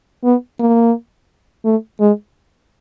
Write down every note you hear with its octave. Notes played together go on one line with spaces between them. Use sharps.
B3
A#3
A3
G#3